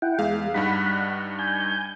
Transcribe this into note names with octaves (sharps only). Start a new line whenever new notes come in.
E4 F#5 G5
E2 G#3 F5
G2 G3 D#4 F#5 B5
G#5 G6